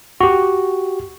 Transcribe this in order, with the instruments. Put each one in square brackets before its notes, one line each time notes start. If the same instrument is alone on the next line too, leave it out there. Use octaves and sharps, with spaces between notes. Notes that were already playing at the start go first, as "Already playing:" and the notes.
[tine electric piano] F#4 G4